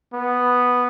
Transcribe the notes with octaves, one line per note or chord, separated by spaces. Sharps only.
B3